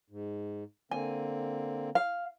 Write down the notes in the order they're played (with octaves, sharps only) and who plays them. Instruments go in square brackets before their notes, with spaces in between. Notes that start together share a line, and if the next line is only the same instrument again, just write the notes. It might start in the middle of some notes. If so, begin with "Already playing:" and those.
[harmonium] G#2
[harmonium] D3 A#3 C4 [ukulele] G#5
[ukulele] F5